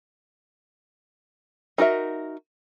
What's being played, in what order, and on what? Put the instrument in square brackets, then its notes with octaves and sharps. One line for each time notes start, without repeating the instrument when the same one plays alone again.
[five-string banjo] D#4 F#4 A#4 E5